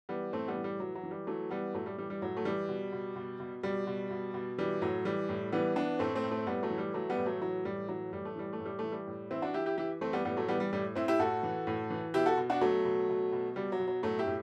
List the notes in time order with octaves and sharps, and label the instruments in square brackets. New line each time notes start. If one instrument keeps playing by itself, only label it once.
[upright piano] E3 G3 B3
A2 A3 C4
G3 B3
E3
G3
E3 F#3
F#3
E3
G3
E3 F#3 A3
E3 G3 B3
A2 F#3 A3
G3
E3 G3
G3
A2 F#3
A3
E3 G3
B2
B2
B2
B2
B2 G3
B2
B2
B2
E3 G3
A2 F#3
E3 G3
A2
E3 G3 B3
E3 B3 D4
A2 A3 C4
A3 C4
A2
A3 C4
A2 G3 B3
F#3 A3
E3
G3
E3 F#3 A3
G3 B3
A2
F#3 A3
E3 F#3
A2 G3
E3 F#3
A2 G3
A3
E3 G3
A3
A2
G3
E3 A3
G3
A2
E3 C4 E4
D4 F#4
E3 E4 G4
E4 G4
E3 E4 G4
E3 A3 C4
G3 B3
A2 G3 B3
F#3 A3
E3 G3 B3
G3
A2 G3
A2 C4 E4
E4 G4
A2 F#4 A4
E3
A2
E3
B2 E4 G4
F#4 A4
B2
D4 F#4
B2 F#3 A3
B2
B2
B2
B2 G3
F#3
B2
F#3
A2 F#3 A3
E4 G4
A2